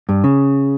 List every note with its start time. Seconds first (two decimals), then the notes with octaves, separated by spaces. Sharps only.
0.09 G2
0.24 C#3